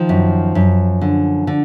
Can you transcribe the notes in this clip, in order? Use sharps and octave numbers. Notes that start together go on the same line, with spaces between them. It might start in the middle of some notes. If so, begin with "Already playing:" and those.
Already playing: D#3 F3
F#2
F#2
D3
D3